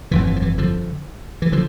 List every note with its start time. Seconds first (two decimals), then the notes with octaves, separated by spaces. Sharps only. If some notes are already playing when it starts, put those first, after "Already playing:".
0.11 G1 F2 D3 E3
0.27 E3
0.36 F3
0.42 E3
0.58 D3 F3
1.42 E3
1.52 D3 F3